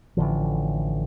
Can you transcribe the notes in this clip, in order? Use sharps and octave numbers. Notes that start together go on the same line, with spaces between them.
A1 D3 F3